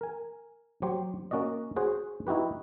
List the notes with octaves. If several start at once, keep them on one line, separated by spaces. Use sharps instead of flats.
A#4 G#5
F#3 G4 C5
A#3 C#4 F#4 D5 D#5
F#4 G#4 C5 C#5 F#5
D#4 E4 F#4 G4 B4